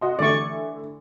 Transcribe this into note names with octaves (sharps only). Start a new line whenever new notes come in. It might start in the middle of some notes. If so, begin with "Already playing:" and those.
F#4 D#5 C6
D3 E3 A3 D5 C#6